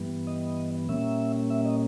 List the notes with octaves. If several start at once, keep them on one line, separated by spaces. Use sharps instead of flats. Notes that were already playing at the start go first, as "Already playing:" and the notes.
Already playing: G2 E3 G3 B3
D#5
A#2 G3 A#3 C#4 E5
E5
D#5